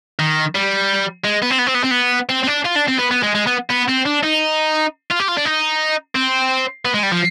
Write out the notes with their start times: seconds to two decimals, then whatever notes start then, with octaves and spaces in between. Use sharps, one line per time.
0.19 D#3
0.55 G3
1.25 G#3
1.43 B3
1.51 C4
1.59 B3
1.67 C4
1.75 B3
1.84 C4
1.91 B3
2.29 C4
2.44 C4
2.48 D4
2.65 F4
2.76 D4
2.88 C4
2.99 B3
3.11 B3
3.23 G#3
3.35 G#3
3.47 B3
3.70 B3
3.88 C4
4.05 D4
4.23 D#4
5.11 F4
5.19 G4
5.28 F4
5.37 D4
5.45 D#4
6.15 C4
6.85 B3
6.94 G#3
7.03 G3
7.12 F3